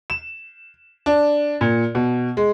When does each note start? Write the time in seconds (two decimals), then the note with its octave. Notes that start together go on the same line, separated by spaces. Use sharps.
0.10 E7
1.06 D4
1.61 A#2
1.95 B2
2.37 G#3